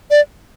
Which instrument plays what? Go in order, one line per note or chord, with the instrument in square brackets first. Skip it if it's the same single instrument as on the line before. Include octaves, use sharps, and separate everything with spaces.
[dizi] D5